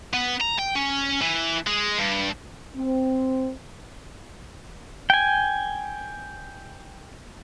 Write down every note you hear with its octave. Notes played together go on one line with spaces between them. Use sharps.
B3
A#5
G5
C#4
E3
G#3
G2
C4
G5 G#5